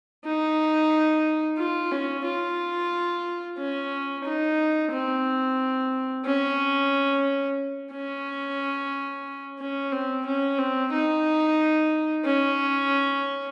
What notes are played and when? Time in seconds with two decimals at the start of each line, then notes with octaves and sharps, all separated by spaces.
0.25 D#4
1.58 F4
1.91 C#4
2.24 F4
3.58 C#4
4.25 D#4
4.92 C4
6.25 C#4
7.92 C#4
9.58 C#4
9.92 C4
10.26 C#4
10.58 C4
10.92 D#4
12.25 C#4